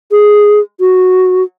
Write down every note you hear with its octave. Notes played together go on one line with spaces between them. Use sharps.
G#4
F#4